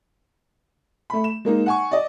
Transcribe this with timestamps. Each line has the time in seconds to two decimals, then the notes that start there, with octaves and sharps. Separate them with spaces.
1.10 A3 B5
1.24 E7
1.45 G#3 A#3 D#4
1.66 F#5 G#5 C#6
1.91 D5 D#5